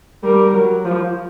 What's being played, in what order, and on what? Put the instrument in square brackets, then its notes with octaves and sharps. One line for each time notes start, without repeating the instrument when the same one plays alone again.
[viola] G3 [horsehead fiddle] A#4
[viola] F#3
F3